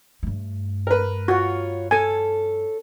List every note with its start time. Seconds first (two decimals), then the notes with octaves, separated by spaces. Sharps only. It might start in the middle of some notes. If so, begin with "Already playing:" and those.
0.23 G2 A3
0.87 A#4 B4
1.28 F4 F#4 C#5
1.91 C#4 A4 G#5